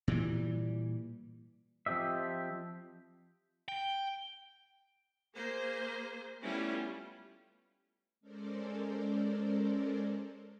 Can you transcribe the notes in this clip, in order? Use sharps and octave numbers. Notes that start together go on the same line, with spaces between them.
A#2 E3 G3
F3 C4 G4 D#5 E5
G5
A#3 G#4 C5
G3 A3 B3 C#4 E4 F4
G#3 C#4 A4 A#4 C5 D5